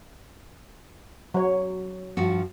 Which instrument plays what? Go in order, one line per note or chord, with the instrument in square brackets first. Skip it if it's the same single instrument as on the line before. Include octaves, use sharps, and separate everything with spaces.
[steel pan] F#3 C#5
[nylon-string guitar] G2 F3 F#4